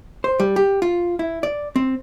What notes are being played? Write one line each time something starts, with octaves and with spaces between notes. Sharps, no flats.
C5
G3
G4
F4
E4
D5
C4